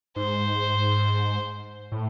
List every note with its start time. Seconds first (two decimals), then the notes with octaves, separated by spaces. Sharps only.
0.16 G#2 C5
1.92 A2